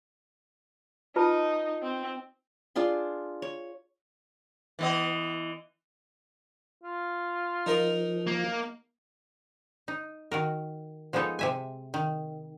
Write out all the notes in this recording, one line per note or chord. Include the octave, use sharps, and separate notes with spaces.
D#4 F4 B4 A5
C4
D4 F4 G#4 C6
C#5
E3 B3 D#5
F4
F3 D#4 A#4 D#5
A#3
D#4
D#3 F#4 A#4
F3 G#3 B3 D#4 A4 C#5
C3 E5 G#5
D#3